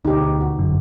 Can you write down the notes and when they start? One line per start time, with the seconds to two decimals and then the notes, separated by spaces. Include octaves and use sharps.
0.05 D2 B2 D#4 G4
0.40 F#4
0.59 G1 F#2 D3